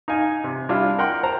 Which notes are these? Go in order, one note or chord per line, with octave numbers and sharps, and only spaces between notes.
D#4 F5 G#5
C3
G3 D4 E4 F4
A#4 F#5 G5 C6
C5 A5 A#5